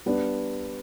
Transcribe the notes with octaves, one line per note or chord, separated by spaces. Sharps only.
G3 B3 D4